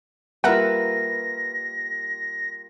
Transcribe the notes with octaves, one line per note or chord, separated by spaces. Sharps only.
G3 A#3 F4 A#4 B4 E5 F#5 A#6